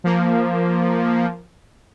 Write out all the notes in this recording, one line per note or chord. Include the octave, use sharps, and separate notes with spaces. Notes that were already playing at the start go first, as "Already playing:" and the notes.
F3 A#3